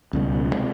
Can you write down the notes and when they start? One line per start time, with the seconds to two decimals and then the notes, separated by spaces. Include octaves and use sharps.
0.13 C#2 B2 G3
0.51 C3 D#3 G#3